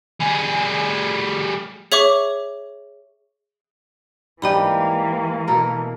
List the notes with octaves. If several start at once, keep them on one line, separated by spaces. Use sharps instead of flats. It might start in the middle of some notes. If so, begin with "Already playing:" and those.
G3 G#4
G#4 C#5 E5 C#6 D6
G#2 E3 G3 A#3 G4 D#5 G5 B5
B2 A4 A#4